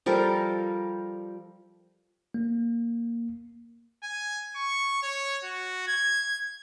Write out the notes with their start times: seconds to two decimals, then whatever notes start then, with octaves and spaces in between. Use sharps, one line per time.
0.06 F3 G3 A4 A#4
2.34 A#3
4.03 G#5
4.56 C#6
5.03 C#5
5.44 F#4
5.88 G#6